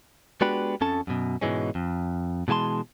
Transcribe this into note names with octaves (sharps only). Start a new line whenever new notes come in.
G#3 B3 D4 F#4 G4 B4
F2 F3 C#4 A4 A5
F#2 B2
G#2 B2 E3 G#3 C#4
F2
B2 E3 G#3 A5 C6